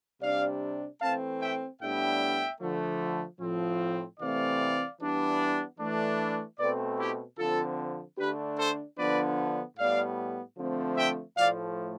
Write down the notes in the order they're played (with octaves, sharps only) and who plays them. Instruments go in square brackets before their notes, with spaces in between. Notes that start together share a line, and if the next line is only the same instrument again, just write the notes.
[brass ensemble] C3 G3 D4 D5 F5
E3 A3 C4 F5 A5
E5 G5
A2 G3 B3 D4 E5 G5
D3 F3 A3
A2 F3 C4
C3 E3 A3 C4 D5 F5
E3 G3 B3 D4
E3 A3 D4
B2 A3 C4 B4 D5
E4 G4
D3 F3 C4 F4 A4
D3 A3 D4 G4 B4
A4 C5
D3 F3 B3 D4 B4 D5
A2 G3 B3 D5 F5
D3 F3 A3 C4
E5 G5
A2 F3 A3 D5 F5